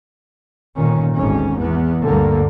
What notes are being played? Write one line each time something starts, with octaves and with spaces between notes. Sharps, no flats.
G1 A#2 D#3 C#4
G#1 D2 G#2 C#4
E2 B3
D2 G2 D3 A#3